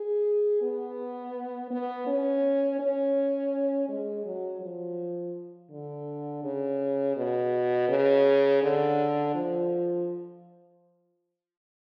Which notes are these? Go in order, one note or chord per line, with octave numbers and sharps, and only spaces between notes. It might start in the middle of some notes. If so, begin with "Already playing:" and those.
Already playing: G#4
B3
B3
C#4
C#4
G#3
F#3
F3
D3
C#3
B2
C#3
D3
F3